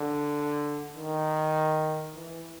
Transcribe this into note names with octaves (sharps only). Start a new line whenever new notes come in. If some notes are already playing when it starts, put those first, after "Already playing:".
Already playing: D3
D#3
E3